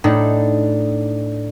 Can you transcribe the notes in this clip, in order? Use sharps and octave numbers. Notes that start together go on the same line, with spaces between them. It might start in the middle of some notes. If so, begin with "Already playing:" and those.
A2 D4 D#4 A4